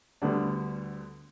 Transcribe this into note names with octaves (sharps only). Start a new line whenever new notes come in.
D2 D3 G3 B3 D4